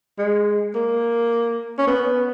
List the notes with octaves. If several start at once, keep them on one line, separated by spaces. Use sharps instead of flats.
G#3
A#3
C#4
B3